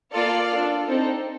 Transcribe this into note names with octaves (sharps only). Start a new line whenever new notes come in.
A#3 F4 A4 D5 F5
D4 F4 A4
C4 D#4 A4